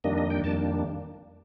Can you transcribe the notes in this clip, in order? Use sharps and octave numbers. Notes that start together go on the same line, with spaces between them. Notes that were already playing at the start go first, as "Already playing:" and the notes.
F2 D#3 G3 A#3 D4 D#5
D#5
G5
F2 D#3 G3 A#3 D4 A5